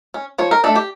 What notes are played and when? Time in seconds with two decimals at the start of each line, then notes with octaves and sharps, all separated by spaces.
0.14 C#4
0.38 F3 C#5
0.51 A#4
0.64 A3 D4 A4
0.75 G4